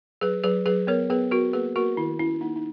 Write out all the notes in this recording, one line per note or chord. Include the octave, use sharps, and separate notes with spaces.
F#3 G#4 B4
F#3 G#4 B4
F#3 G#4 B4
B3 A#4 C#5
B3 G#4 B4
B3 F#4 A#4
A#3 G#4 B4
A#3 F#4 A#4
D#3 E4
C#4 E4
A#3 D#4
D#4